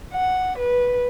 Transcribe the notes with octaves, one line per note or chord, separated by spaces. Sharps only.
F#5
B4